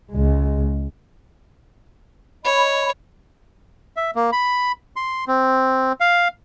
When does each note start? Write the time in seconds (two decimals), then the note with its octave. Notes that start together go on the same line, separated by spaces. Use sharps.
0.11 C#2 G#3
2.45 C#5 D#5 B5
3.97 E5
4.15 A#3
4.32 B5
4.96 C6
5.28 C4
6.00 F5